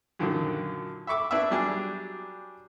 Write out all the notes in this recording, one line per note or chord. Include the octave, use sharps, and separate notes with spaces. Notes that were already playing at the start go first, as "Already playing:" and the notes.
F#2 A#2 D3 D#3 F3 F#3
E5 B5 C#6 D6 E6
D4 E4 B4 D5 E5
F#3 G3 D4 G4 G#4